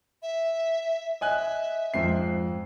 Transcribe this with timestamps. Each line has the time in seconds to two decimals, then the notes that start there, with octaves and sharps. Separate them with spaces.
0.22 E5
1.21 D#5 E5 G#5 F#6
1.94 F2 G#2 C7